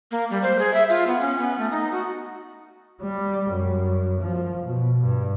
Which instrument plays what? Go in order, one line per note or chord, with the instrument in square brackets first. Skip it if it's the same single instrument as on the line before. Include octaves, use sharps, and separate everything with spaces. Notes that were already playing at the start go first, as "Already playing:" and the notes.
[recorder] A#3
G3
C5
G#4
E5
F4
B3
C#4
B3
A3
D#4
F#4
[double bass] G3
F#2
F3
B2
G2